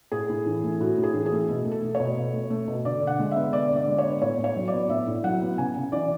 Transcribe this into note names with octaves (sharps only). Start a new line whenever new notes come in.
A2 G#4
A2
E3
A3
A2 F#4
A2
G#4
E3
G#4
A3
B2 A4
A3
A4
A3
C#5
B2
B2
A3
A3
B2
D3 D5
D3
F#5
G#3
B3 E5
D3 D5
D3
D5
G#3
C#5
B3
A2 C#5
A2
C#5
F#3
D5
B3
A2 E5
A2
F#3 F#5
B3
C#3 G#5
C#3
E3 D5